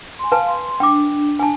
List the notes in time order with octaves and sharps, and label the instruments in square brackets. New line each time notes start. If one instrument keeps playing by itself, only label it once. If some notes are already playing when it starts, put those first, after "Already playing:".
[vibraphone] G#5 C6
[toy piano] B4 G#5 A5 [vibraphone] F5
[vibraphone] C6
[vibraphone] D4 [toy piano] G5 D6
[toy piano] G#5 A5